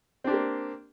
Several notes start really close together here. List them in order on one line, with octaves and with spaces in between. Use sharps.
C4 D4 G4 A#3